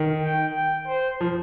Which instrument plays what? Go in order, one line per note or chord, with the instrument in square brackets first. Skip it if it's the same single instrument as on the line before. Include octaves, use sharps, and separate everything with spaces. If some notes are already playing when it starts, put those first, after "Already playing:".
Already playing: [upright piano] D#3
[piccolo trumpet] G5
G5
C5
[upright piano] F3